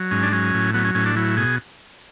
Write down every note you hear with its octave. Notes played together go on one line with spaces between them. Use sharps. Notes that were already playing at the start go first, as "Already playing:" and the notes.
Already playing: F#3
G#2 C#4
D4
F#3 C#4
A2
F#3 B3
C#4
A2 C#4
D4
F#3 E4
B2 G#4